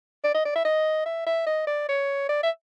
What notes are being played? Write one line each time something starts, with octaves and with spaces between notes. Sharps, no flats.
D5
D#5
D5
E5
D#5
E5
E5
D#5
D5
C#5
D5
E5